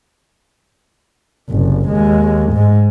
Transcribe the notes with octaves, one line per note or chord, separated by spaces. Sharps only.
F#1 C2
D#2 G#3
G#2 G#3